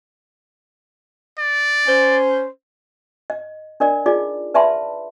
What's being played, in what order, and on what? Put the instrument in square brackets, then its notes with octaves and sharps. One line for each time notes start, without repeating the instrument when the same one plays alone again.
[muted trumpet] D5
[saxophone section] C#4 C5
[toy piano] D#5
D4 A#4 D5 D#5
D#4 F4 G#4 D5
B4 D5 E5 A5 B5 C6